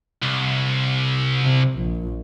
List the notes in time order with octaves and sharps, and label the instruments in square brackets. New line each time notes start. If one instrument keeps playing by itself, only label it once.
[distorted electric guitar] C2
[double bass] C3
A#1